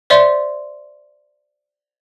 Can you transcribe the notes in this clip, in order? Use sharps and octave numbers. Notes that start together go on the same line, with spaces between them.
C5 D5 E5 C6